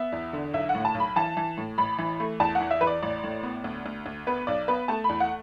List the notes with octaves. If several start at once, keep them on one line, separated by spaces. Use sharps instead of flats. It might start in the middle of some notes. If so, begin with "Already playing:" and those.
Already playing: B3 E5
E2
D3
B1 E5
F#5
A2
A5
B1
B5
E3 A5
E3
A2
A1 B5
E3
A3
E2 A5
F#5
E3
E5
E2 B4
D5
A1 D5
A2
B3
D2
D2
D2
B3 B4
B1 D5
B3 B4
A3 A5
B5
E2
F#5